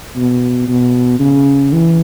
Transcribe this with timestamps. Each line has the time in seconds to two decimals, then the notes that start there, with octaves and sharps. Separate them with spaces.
0.16 B2
0.68 B2
1.19 C#3
1.73 E3